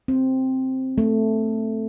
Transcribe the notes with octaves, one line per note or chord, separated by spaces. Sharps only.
C4
A3